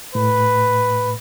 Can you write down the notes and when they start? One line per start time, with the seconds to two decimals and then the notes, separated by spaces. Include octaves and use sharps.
0.15 A2 B4